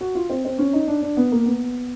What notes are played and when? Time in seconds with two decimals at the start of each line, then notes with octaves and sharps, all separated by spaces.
0.01 F#4
0.15 F4
0.30 C4
0.45 C4
0.58 C#4
0.73 D#4
0.88 D4
1.02 D4
1.17 B3
1.32 A#3
1.46 B3